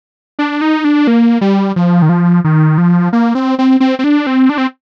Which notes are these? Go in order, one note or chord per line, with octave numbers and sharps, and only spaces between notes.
D4
D#4
D4
A#3
G3
F3
D#3
F3
D#3
F3
A#3
C4
C4
C4
C4
D4
C4
D4
C4